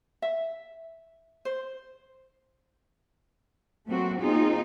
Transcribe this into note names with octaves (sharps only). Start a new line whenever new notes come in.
E5
C5
F#3 A3 A#3 C4 F#4
A#3 C4 D#4 F4 G#4